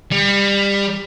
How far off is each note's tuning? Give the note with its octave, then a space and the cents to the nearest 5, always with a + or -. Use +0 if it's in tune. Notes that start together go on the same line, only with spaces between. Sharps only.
G3 +25